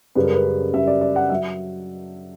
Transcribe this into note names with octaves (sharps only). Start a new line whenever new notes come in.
F#2 C#3 G3 B4
A#4
B4
F#2 C#3 G3 E5
D5
D5
F#5
F#3 E5